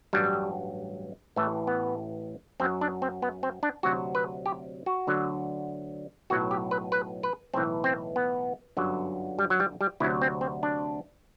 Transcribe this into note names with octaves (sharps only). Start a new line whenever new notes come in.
A1 G2 F#3 G3
A1 A2 E3 A3
B3
F#2 F#3 C4
D4
C4
B3
C4
D4
D2 C3 F#3 F#4
B4
G4
F#4
D2 D3 F#3
B1 A2 F#3 F#4
G4
B4
B4
B4
B1 A2 E3 C4
C4
B3
G1 F#2 D3 F#3
G3
F#3
G3
G3
D2 C3 F#3 E4
C4
C4
D4